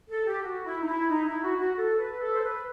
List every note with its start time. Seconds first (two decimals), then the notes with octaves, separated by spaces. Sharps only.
0.09 A4
0.26 G4
0.43 F#4
0.65 E4
0.81 D#4
0.86 E4
1.09 D#4
1.26 E4
1.43 F#4
1.59 F#4
1.76 A4
1.98 B4
2.20 A4
2.33 C5
2.42 B4